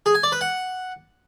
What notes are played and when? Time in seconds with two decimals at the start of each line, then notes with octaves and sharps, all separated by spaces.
0.06 G#4
0.15 G#5
0.23 D5
0.32 B4
0.41 F#5